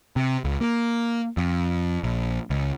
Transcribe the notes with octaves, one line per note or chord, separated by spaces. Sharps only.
C3
C#2
A#3
F2
A#1
C#2